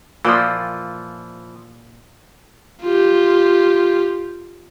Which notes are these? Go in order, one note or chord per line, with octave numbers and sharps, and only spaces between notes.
A#2 E3 F3 C5 D5
F4 G4